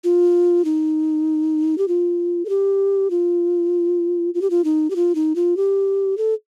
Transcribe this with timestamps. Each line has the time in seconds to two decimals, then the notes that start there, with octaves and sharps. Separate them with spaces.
0.04 F4
0.65 D#4
1.78 G4
1.88 F4
2.45 A4
2.49 G4
3.10 F4
4.34 F4
4.42 G4
4.50 F4
4.64 D#4
4.90 G4
4.96 F4
5.15 D#4
5.36 F4
5.57 G4
6.18 A4